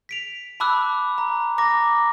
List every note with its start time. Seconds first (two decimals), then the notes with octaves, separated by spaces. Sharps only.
0.09 B6 D7 F7
0.60 A5 B5 D6 E6 F#6
1.18 A#5
1.58 A#5 D6 A#6